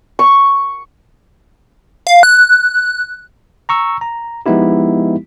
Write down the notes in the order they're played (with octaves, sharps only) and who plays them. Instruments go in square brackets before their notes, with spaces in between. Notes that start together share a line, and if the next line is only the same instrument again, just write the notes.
[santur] C#6
[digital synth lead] F5
F#6
[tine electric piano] A#5 C#6 E6
A#5
F3 G#3 B3 D#4 E4 G4